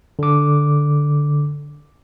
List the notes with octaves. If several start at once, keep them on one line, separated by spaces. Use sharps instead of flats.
D3 D6